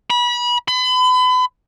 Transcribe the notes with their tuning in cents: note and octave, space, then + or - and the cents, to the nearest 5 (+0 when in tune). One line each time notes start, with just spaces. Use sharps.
B5 -30
B5 +35